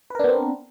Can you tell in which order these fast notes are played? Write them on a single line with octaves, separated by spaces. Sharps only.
B4 A#4 D4 B3 C4